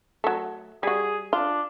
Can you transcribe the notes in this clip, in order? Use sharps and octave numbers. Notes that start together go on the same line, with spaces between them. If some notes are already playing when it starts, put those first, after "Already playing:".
F#3 A3
G3 F#4 G#4
D4 F4